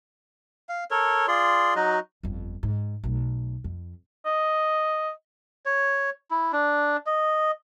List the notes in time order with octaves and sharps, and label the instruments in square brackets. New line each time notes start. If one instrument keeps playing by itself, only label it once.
[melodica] F5
A4 A#4 C#5
F4 G#4 D5 C6
F#3 D#4 F#4 D#5
[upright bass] G1 F2
G#2
B1 A3
F2
[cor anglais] D#5
[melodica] C#5
E4
D4
D#5